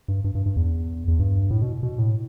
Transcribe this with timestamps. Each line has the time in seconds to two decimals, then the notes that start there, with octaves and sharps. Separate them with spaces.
0.08 G2
0.24 G2
0.35 G2
0.46 G2
0.56 E2
1.08 E2
1.19 G2
1.51 A2
1.62 B2
1.83 B2
1.98 A2